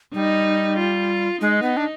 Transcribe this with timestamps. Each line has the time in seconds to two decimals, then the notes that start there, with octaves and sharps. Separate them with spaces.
0.14 G3 D#4
0.78 F4
1.41 G#3 D#4
1.62 B3
1.77 D4